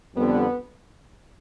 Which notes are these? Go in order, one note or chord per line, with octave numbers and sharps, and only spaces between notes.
F2 D3 G3 B3